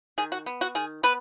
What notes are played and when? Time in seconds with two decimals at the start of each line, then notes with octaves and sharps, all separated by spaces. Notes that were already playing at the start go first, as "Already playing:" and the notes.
0.18 D#3 G#4
0.32 F#4
0.46 B3
0.61 F#4
0.75 D#3 G#4
1.03 B3 B4